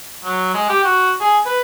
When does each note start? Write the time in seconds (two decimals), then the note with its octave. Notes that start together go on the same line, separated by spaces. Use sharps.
0.24 F#3
0.54 G#3
0.69 G4
0.84 F#4
1.20 G#4
1.46 B4